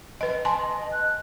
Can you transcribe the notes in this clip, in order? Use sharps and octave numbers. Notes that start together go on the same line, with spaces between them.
B4 D#5
D#5 G#5 A5 C6
F#6